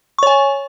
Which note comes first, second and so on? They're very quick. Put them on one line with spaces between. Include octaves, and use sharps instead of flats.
C#6 C#5 G#5